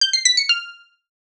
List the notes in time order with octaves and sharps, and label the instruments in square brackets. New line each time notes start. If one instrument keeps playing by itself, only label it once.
[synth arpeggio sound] G6
C7
B6
C#7
F6